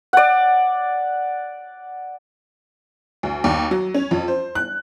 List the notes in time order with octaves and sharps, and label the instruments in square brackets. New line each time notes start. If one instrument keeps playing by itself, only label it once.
[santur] D5 F#5
[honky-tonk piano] D2
D#2
F#3
C#4
F2
C5
F#6